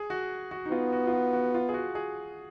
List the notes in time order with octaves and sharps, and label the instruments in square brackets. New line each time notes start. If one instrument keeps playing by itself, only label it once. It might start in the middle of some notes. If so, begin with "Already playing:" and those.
Already playing: [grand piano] G#4
F#4
F#4
D#4
[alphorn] B3 [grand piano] F4
[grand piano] F#4
F4
F#4
F#4
F4
G#4
F#4
G#4